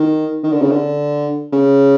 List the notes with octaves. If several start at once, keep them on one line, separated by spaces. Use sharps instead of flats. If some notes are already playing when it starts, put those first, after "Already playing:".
Already playing: D#3
D#3
D3
C#3
D3
C#3